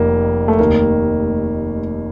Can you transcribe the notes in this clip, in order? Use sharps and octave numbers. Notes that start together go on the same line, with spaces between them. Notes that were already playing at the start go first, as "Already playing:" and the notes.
Already playing: F1 F2 D#3 A#3
A3
F1 D#2 D#3 A#3